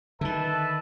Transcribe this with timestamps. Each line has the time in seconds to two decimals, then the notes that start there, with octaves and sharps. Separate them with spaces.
0.21 D3 D#3 B4 E5 A5